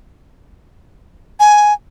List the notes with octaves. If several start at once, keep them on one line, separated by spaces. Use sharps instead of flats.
G#5